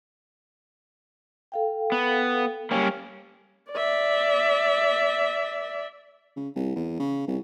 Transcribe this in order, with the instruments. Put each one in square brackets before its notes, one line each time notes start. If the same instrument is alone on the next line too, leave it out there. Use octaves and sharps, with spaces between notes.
[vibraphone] A4 F5 G5
[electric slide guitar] B3
[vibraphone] G3 G4 G5 [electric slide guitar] A#3 C#4
[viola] D5 E5
[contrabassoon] C#3
C2
E2
C#3
C2